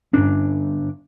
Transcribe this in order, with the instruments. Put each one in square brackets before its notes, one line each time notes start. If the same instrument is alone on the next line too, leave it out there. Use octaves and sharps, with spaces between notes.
[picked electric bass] G1 D4 [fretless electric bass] G2 C#4